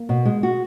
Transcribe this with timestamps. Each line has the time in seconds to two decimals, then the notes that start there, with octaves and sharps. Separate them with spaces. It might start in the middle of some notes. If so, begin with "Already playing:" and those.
Already playing: A#3
0.09 B2
0.25 G#3
0.43 F#4